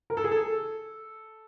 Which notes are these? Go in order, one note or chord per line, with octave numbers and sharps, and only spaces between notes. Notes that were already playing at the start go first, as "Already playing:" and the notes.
A#4
A4
G#4
A4